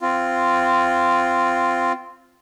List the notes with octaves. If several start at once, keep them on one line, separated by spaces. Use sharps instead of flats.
C4 F4